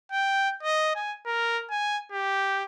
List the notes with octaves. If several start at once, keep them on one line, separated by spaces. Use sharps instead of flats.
G5
D#5
G#5
A#4
G#5
G4